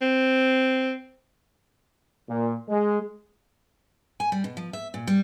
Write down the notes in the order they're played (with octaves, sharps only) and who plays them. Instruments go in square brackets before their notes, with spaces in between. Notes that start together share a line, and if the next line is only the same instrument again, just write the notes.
[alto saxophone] C4
[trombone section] A#2
G#3
[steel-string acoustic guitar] G#5
G3
B2
F3
E5
A#2
G3